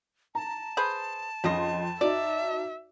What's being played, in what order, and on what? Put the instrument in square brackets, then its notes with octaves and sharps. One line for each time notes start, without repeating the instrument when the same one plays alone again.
[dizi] A5 [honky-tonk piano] A#5
[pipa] G#4 B4 C5
[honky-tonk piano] F2 C6 [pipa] C#3 D#5
[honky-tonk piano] D#4 F#4 [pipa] D5 [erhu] E5